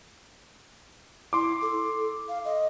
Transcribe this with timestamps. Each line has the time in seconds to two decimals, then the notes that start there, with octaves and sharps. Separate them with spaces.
1.33 E4 C6 D6
1.62 A4
2.29 F5
2.45 D#5